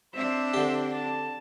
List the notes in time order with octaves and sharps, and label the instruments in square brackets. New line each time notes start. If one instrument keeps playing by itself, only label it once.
[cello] C4 D4 [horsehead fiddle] C5 E5
[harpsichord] D3 G4
[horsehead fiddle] A5